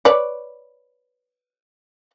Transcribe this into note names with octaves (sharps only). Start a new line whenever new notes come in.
B4 C#5 D5